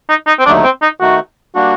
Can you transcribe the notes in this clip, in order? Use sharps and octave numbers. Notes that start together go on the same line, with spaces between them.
D#4
D#4
C4
D#2 D3 F#3 A3 D4 D#4
C4
D#4
D#3 A3 D#4 F#4
G3 A#3 D4 F#4